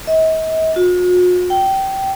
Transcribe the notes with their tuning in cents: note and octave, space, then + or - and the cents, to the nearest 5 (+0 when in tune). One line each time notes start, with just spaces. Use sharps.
D#5 +45
F#4 -45
G5 -20